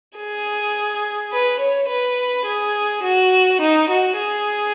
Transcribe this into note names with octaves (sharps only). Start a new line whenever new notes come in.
G#4
B4
C#5
B4
G#4
F#4
D#4
F#4
G#4